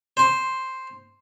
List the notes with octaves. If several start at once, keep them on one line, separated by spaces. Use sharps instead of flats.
C5 C6